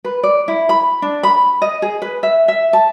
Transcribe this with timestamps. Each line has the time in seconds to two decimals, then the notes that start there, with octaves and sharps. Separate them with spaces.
0.05 B4
0.23 D5
0.48 E4
0.69 B5
1.02 D4
1.23 B5
1.62 D#5
1.82 G#4
2.02 B4
2.23 E5
2.48 E5
2.73 A5